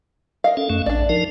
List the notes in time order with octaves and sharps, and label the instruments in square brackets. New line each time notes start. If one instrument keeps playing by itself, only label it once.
[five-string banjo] A#4 D#5 F5
[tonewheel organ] C#4 A4
F#2 A3 C#4
[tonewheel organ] A1 [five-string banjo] D4 D5
[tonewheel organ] F3 D#4 A#4